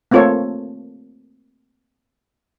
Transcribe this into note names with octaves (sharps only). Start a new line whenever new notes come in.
A3 A#3 C4 F4 A4 C#5